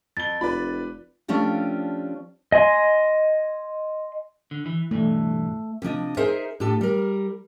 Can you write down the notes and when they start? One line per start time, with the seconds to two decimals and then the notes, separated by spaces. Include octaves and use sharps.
0.17 F2 A6 G7
0.41 F1 F4 B4 D5 B5
1.28 F3 A3 C#4 D4 F4 G4
2.52 D#5 G#5 C6
4.51 D3
4.66 E3
4.91 B1 G2 E3 A3
5.82 C3 F3 D4 D#5
6.17 D#4 G#4 A#4 C5 E5
6.60 A2 D4 F4 G4 A4
6.81 G3 A#4